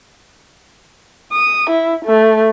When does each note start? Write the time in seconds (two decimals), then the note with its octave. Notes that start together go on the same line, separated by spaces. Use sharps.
1.32 D#6
1.70 E4
2.05 A3